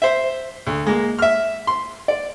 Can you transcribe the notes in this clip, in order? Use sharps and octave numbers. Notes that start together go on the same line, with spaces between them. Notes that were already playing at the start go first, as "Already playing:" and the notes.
C5 E5
D2
G#3 A#3
E5 F6
C6
D5